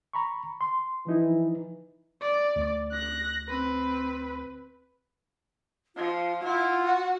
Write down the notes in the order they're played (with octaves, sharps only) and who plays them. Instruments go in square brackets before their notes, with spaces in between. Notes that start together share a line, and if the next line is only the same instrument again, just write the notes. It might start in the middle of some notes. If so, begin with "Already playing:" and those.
[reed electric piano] A#5 B5 C#6
C6
[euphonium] E3 [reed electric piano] F3 D#4 E4
[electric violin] D5
[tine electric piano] D2
[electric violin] F#6 A#6
C4 B4
[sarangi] F3 [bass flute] F4
[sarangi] E4 [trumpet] F4 [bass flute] F#5
[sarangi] F#4